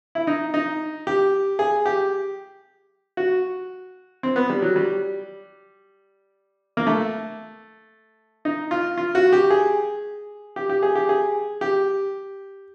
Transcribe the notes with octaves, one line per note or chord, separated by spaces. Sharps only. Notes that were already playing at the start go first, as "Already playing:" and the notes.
E4
D#4
D#4
G4
G#4
G4
F#4
C4
B3
G3
F#3
G3
A#3
A3
D#4
F4
F4
F#4
G4
G#4
G4
G4
G#4
G4
G#4
G4